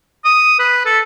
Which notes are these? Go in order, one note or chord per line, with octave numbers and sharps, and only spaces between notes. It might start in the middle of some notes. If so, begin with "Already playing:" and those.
D#6
B4
A4